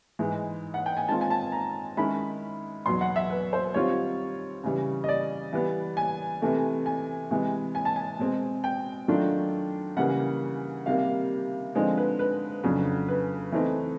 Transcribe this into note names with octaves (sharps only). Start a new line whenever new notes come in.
G#2 E3 G#3
F#5
G5
G#5
D#3 G#3 C4 F4 A5
G#5
A5
A#5
D#3 G#3 C#4 E4 B5
E2 B2 F#3 C6
F#5
E5
B4
C5
D#3 G3 C4 F4 C#5
C#3 E3 G3
D#5
D5
E3 G3 B3
G#5
C3 E3 A3
G#5
C3 E3 G#3
G#5
A5
G#5
B2 G#3 C4
G5
D#3 F#3 A3 D4 F4
C#3 E3 G3 A#3 F#5
C3 D#3 G3 A#3 F5
D3 F3 G#3 C4 D#4
B4
B4
F2 C#3 F#3 B3 D4
B4
E3 A3 C4 D#4